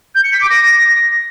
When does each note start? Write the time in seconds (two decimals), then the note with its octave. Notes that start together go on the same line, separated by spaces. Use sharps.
0.14 G6
0.23 C#7
0.32 B6
0.40 D6
0.49 A#6